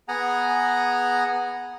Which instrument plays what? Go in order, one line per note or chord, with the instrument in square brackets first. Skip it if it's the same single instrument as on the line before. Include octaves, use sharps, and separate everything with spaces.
[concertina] B3 G#4 F#5 G#5 A#5